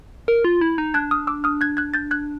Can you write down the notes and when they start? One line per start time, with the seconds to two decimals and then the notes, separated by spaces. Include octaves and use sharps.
0.28 A#4
0.44 F4
0.61 E4
0.78 D#4
0.94 D4 F#6 G#6
1.11 D#6 F6
1.27 D6 E6
1.44 D#6 F6
1.61 F#6 G#6
1.77 F#6 G#6
1.94 G6 A6
2.11 F#6 G#6